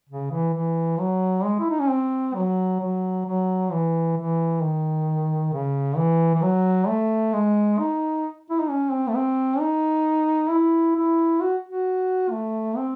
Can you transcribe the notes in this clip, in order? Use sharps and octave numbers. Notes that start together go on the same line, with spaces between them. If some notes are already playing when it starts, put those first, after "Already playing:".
C#3
E3
E3
F#3
G#3
E4
D#4
C#4
C4
F#3
F#3
F#3
E3
E3
D#3
C#3
E3
E3
F#3
A3
G#3
D#4
E4
D#4
C#4
C4
A3
C4
D#4
E4
E4
F#4
F#4
A3
C4